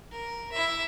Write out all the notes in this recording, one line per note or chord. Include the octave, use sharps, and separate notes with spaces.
A#4
E4 E5